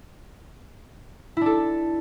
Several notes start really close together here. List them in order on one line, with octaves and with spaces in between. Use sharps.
E4 D4 A4